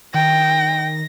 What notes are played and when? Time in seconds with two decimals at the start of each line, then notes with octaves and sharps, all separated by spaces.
0.14 D#3 G5 A#6